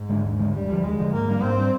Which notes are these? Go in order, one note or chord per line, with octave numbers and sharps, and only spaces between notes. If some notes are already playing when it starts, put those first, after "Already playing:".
Already playing: G#2
D3 G#3 D4
D#2
D3 G#3 D4
D#2 G3
D3 F3
D#2 G#3
D3 F3
G#2 A#3
G3 D4
G#2 C4
G3 D4